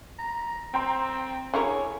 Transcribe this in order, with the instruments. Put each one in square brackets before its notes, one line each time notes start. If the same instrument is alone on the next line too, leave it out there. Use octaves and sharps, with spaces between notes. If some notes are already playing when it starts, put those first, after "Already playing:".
[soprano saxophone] A#5
[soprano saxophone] C4 [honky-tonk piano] G5 A#5 C6
[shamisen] D3 E4 A#4 [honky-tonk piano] G#4 G#5 [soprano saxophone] C#5